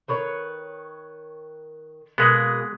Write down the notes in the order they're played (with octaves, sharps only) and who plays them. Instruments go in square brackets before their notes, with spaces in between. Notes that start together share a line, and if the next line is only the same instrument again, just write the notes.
[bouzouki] D#3 B4 C#5
[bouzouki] B2 A#3 G#4 [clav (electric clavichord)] G#3 B3